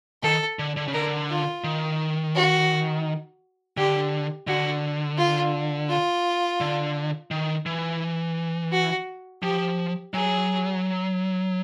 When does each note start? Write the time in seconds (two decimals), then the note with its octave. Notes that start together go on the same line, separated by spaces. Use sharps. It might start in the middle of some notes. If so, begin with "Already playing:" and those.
0.23 D#3 A4
0.59 D3
0.77 D3
0.88 C#3
0.93 D3 A#4
1.30 F4
1.64 D#3
2.35 F#4
3.77 D3 G4
4.47 D3 F#4
5.18 F4
5.89 F4
6.61 D3
7.31 D#3
7.66 E3
8.72 F#4
9.43 F3 G4
10.14 F#3 G#4